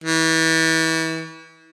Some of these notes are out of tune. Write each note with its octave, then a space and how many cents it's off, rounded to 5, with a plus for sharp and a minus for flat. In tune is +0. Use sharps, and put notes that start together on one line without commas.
E3 -30